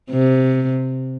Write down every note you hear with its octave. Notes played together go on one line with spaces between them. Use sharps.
C3